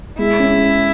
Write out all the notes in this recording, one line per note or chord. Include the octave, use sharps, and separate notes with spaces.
G#3 E4
C#4